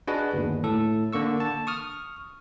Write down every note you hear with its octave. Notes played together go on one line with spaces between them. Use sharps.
D4 F#4 G#4 B4 D#5
G1 D#2
A2 A4
D3 A#3 C#6 E6
A5
C#6 D#6 F6